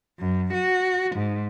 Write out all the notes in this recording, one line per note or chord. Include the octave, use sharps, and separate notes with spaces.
F#2
F#4
G#2